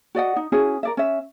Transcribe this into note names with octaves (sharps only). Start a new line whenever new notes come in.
F#4 D5 D#5 F#5
D#4
C#4 E4 F#4 G#4
A#4 D5 E5
C#4 E5